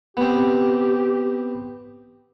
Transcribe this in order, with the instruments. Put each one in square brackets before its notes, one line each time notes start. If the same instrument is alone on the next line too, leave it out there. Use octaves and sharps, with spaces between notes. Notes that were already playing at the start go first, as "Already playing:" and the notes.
[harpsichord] B3 C4 [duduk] G4